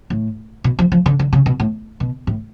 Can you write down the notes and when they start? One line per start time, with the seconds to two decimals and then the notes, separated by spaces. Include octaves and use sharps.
0.10 A2
0.64 B2
0.79 F3
0.92 F3
1.06 D3
1.19 D3
1.33 C#3
1.46 B2
1.60 A2
2.00 B2
2.27 A2